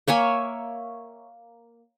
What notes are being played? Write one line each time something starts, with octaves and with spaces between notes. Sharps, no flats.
A#3 C#5 E5 G#5